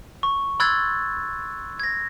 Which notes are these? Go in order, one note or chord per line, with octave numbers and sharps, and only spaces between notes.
C#6
B5 C6 E6 F#6 G#6 A6
G#6 A#6